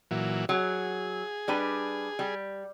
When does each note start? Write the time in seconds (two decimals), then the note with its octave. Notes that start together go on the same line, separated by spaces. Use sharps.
0.11 A#2 E3 F#3
0.49 F#3 G#4
1.48 G3 D4 B4
2.19 G3